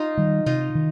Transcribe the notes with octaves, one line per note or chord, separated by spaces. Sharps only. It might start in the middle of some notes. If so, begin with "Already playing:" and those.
Already playing: D#4 F4
D#3 G3
C3 D#4 F4
D#3